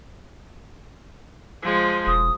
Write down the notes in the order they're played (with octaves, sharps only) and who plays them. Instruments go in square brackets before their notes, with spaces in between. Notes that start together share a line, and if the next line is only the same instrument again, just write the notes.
[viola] F3 G#3
[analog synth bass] E1 [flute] D#6